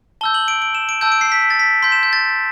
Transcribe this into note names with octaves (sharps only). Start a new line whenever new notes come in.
A5 E6 G6 G7
F#7
D7
D7
E7
D7
A5 E6 G6 D7
D7
C7
B6
B6
A6
B6
C6 G6 B6
E7
G6
A6